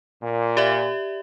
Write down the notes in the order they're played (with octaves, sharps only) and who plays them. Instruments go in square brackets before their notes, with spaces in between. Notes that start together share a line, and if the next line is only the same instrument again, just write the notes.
[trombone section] A#2
[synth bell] G4 D5 E5